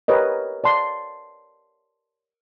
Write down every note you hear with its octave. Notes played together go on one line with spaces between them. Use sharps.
G4 A#4 B4 C#5 D#5
D5 A5 C6